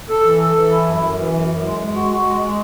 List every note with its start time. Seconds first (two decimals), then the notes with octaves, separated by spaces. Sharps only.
0.09 A4
0.25 E3
0.41 A4
0.56 E3
0.71 E4
0.87 F#2
1.02 F#2
1.18 E3
1.33 F#2
1.49 F#2
1.65 G#3
1.80 G#3
1.95 F#4
2.11 F#4
2.26 G#3
2.41 G#3